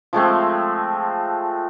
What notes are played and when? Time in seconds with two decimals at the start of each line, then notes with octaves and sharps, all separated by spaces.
0.13 F3 G#3 A3 C4